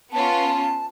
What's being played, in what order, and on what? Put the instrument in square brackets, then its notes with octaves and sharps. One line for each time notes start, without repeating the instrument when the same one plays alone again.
[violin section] B3 C#4 F4 [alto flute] A5